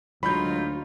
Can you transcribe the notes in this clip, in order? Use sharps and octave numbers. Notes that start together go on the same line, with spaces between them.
D2 F#3 G#3 D#4 F4 C#5 B5 G6